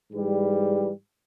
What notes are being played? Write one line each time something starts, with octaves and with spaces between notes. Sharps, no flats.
G#2 E3 G3